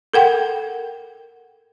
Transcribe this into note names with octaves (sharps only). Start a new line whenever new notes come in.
A4 A#4 F#5 G5